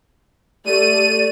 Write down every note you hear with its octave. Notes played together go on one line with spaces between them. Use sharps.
A3 G4 D5 D#7